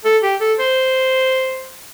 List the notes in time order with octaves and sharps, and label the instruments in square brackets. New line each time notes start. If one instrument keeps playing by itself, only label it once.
[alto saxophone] A4
G4
A4
C5